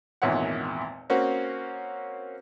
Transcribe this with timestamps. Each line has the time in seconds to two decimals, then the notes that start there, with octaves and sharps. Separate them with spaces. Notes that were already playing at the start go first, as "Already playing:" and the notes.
0.22 G#1 E2 A#2 C#5 F#5
1.10 A#3 C4 C#4 F#4